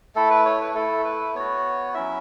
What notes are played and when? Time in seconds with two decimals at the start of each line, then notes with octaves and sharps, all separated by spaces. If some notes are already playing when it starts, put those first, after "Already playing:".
0.16 A3 E4 A4
0.30 B4
0.45 C#5
0.61 B4
0.75 A3 E4 A4
1.05 B4
1.35 B3 F#4 C#5
1.94 F#3 C#4 E4 E5